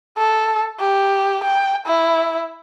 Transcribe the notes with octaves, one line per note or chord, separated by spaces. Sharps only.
A4
G4
G5
E4